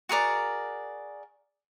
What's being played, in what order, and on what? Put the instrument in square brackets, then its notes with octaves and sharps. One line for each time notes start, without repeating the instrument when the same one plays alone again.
[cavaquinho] F#4 G#4 A#4 D5